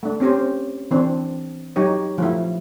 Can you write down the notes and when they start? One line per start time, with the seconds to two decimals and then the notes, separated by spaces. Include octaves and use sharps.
0.03 A3 D4
0.20 C4 C#4 G4 C5
0.91 E3 C4 D4
1.76 F#3 D#4 G4 C#5
2.18 F3 A3 E4